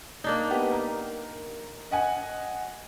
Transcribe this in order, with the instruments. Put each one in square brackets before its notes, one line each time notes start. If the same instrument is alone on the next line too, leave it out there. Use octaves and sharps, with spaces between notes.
[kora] A#3 D4 D#4
[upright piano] B3 G4
A#4
D#5 F#5 G#5